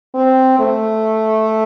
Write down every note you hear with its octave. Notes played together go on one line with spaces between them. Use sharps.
C4
A3